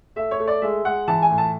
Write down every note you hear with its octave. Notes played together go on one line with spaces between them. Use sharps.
A3 E5
C#5
A3
D5
G#3 E5
G#3 F#5
E3 A5
G#5
A2
A5